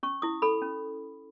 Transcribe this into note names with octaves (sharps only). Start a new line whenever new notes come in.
C#4 C#6
E4 D#6
A4 B5
C#4